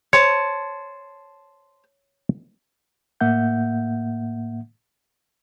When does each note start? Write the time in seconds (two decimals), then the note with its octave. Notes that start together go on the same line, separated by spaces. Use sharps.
0.13 C5 C#5 A5
3.21 A2 A#3 E5 F#5 G6